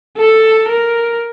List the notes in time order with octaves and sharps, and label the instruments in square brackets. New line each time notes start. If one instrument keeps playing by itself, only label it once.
[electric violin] A4
A#4